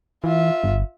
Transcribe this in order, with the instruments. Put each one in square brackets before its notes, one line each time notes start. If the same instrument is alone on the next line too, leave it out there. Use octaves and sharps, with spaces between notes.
[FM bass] E3 [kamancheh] F4 E5
[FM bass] G1